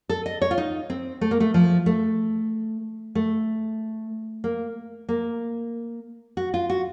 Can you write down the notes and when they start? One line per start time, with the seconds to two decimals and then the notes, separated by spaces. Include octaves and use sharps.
0.09 A4
0.26 D#5
0.42 C#5
0.51 F4
0.58 D#4
0.90 C4
1.21 A3
1.31 A#3
1.40 A3
1.54 F3
1.86 A3
3.15 A3
4.44 A#3
5.09 A#3
6.37 F#4
6.54 F4
6.70 F#4